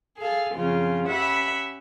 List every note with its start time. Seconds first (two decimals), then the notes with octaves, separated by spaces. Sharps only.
0.18 G#4 A4 F5
0.55 F#2 C#3 F3 C4 C#4 F4
1.07 C#4 G4 E5 F#5 B5